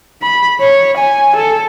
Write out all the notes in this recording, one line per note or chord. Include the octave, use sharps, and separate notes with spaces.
B5
C#5
G#5
A4